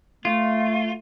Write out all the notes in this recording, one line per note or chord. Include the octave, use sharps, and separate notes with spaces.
A3 F4